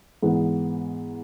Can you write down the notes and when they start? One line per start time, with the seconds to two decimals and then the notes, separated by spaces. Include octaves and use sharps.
0.22 G#2 E3 B3